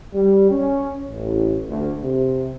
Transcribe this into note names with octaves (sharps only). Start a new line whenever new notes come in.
G3
C#4
A1
D2
C3